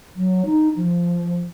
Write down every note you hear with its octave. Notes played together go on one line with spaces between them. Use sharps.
F#3
D#4
F3